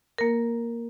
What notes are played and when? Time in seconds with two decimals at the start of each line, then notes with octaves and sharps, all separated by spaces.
0.18 A#3 A#4